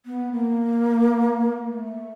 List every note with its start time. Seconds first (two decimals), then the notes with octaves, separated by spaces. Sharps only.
0.06 B3
0.32 A#3
1.64 A3